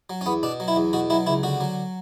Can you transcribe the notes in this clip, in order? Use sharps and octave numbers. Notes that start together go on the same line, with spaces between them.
F#3
C#4
E2 B3
B2 D4
F#3
E4
E2
B2 F#4
F#3 E4
C#2 E4
D3 F#4
F#3